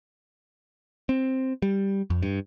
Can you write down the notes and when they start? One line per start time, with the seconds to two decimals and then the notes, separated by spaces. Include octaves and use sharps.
1.09 C4
1.62 G3
2.10 F2
2.22 G2